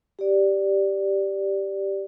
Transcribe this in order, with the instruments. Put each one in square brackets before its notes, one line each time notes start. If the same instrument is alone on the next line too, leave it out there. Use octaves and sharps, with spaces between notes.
[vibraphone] G4 D5